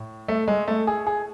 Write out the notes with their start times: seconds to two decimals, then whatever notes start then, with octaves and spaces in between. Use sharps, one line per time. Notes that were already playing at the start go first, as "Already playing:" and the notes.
Already playing: A2
0.28 A3
0.48 G#3
0.68 A3
0.87 G#4
1.07 G#4